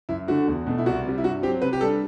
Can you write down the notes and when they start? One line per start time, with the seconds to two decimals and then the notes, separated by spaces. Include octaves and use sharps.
0.09 F#2 E4
0.28 D3 A3 D4 F#4
0.48 E2
0.67 B2 A3
0.78 E4
0.86 C2 F#4
1.05 C3 G3
1.18 E4
1.24 G2 F#4
1.43 C4 G4
1.47 F#3
1.62 C3 B4
1.73 G4
1.81 G3 A4
1.84 D4